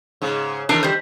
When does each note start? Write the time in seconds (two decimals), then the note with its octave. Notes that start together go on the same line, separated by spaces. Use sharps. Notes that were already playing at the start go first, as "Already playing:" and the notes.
0.22 G#2 C#3
0.69 D#3 E3 D4 D#4 A4 A#4
0.83 G3 C5